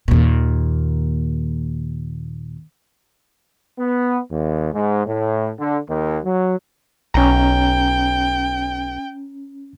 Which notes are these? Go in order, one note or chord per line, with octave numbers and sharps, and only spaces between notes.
D#2 A#2
B3
D#2
G#2
A2
D3
D#2
F#3
B1 C#4 G5 A#5